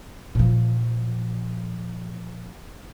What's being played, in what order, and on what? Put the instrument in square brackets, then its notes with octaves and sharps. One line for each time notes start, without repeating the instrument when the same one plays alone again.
[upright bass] A#2 F3